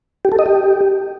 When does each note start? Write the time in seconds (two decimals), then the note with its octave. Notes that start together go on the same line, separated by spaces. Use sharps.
0.25 G4
0.32 A4
0.39 D#5
0.46 G4